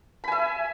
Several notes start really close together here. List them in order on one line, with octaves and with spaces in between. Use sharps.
B5 G#5 E5